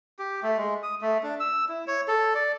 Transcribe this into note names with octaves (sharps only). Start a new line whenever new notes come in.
G4
A3
G#3
D#6
A3
D4
E6
E4
C#5
A4
D5